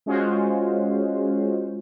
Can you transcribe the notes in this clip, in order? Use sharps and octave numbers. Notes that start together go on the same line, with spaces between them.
G#3 C#4 F4 F#4 C5